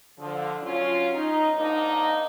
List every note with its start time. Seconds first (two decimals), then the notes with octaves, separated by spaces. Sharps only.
0.19 D3 F3
0.61 F#3 C#4 F4
1.15 D#4
1.56 G#2 A#3 D4 D#4